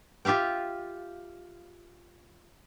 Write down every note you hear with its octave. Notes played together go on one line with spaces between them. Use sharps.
F4 G4 E5 F5 G5